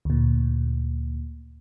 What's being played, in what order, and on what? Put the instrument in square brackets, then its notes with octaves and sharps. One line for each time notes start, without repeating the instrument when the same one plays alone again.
[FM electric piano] D2 A#2